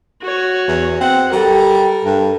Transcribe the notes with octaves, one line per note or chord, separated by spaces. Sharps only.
F#4 C#5
E2
C4 F#5
G3 A4 A#4
G2